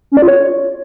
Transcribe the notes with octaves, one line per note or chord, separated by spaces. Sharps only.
C#4
D5
F4
C#5